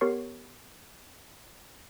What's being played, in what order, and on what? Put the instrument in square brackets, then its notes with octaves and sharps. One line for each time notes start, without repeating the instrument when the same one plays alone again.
[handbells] B3 G4 A#4 C#5 C#6 C7